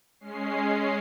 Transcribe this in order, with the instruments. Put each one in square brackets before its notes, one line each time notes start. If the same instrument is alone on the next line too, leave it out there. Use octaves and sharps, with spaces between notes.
[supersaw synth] G#3 C#4 C7